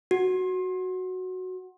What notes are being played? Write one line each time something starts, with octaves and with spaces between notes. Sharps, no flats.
F#4